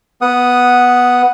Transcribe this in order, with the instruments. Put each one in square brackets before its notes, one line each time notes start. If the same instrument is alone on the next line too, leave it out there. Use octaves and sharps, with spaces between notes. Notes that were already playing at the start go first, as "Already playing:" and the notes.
[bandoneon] B3 F#5 D#6